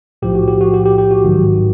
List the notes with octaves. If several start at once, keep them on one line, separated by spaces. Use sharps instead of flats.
B1 A2 F3 G4
F#4
G4
F#4
G4
G4
G4
F#4
G#1 G#2 D#3 F#3